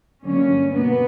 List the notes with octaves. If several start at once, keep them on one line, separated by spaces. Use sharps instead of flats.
G2 D3 F#3 A#3 C#4
B2 A#3 B3